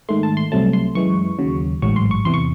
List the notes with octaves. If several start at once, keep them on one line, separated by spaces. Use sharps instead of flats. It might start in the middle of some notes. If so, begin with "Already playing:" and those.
G#2 D#3 A3 C6
A5
C6
C2 C3 F#3 A3 A5
C6
F#2 E3 G#3 C#6
D#2 C#3 F#3
A1 G#2 F#3 C#6
C6
C#6
E2 C3 E3 C6
C#6